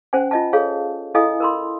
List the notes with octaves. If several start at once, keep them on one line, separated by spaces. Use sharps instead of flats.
C#4 C5 F#5 G#5
F4 D#5 A5
G#4 A4 C#5 F5
E4 A4 D#5 F5 G#5 D#6
A#4 B5 C6